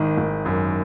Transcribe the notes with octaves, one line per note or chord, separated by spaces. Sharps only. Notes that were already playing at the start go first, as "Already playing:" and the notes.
Already playing: G#1 D#3
G#1
F#2